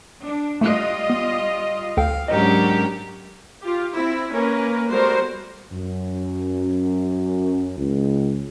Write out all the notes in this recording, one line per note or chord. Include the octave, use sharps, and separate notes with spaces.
D4
G3 A3 F4 D#5 F#6
B3
D2 A4 F5 G5
G#2 F#3 C#4 D4 G4 A#4 D#5
F4 G4
C4 E4
A#3 C#4 A#4 B4
G3 A3 B3 F#4 A#4 C5
F#2
C#2